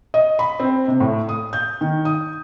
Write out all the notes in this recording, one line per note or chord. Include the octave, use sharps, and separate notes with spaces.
D#5
B5
C4
C3
A2
D#6
G6
D#3
D#6